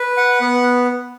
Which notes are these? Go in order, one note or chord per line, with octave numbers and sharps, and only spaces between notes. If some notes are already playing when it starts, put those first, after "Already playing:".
Already playing: B4
F#5
B3